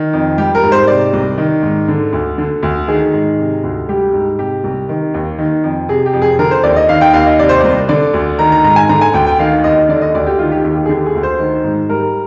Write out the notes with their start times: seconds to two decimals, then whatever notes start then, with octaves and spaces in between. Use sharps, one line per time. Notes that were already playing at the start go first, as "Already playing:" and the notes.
Already playing: D#3
0.13 F2
0.38 G3 G4
0.55 A#4
0.63 G#2
0.72 C5
0.88 C3 D5
1.13 C2
1.38 D#3
1.63 G#2
1.88 D3
2.13 D2
2.38 D3
2.63 D2
2.88 D#3 G#4
3.14 G#2
3.38 C3
3.64 D2
3.89 G3 G4
4.13 G#2
4.38 C3 G4
4.64 C2
4.89 D#3
5.14 D#2
5.39 D#3
5.64 F2
5.89 C3 G#4
6.06 G4
6.13 F2
6.22 G#4
6.39 D3 A#4
6.51 C5
6.63 D#2 D5
6.76 D#5
6.89 D#3 F5
7.01 G5
7.14 D#2 F5
7.26 D#5
7.39 C3 D5
7.49 C5
7.60 C2 D5
7.89 D3 D5
8.14 D2
8.39 D#3 A#5
8.52 A#5
8.64 G#2 A#5
8.76 G#5
8.89 D3 A#5
9.01 G#5
9.14 D2 G5
9.27 G5
9.39 D#3 F5
9.64 D#2 D#5
9.89 D3 D5
10.02 D#5
10.14 D2 D5
10.27 G4
10.39 D#3 F4
10.52 G4
10.64 D#2 G4
10.76 G4
10.86 G#4
10.89 D3 G4
11.06 G#4
11.15 D2
11.23 C5
11.39 D#3
11.64 G#2
11.89 G3 A#4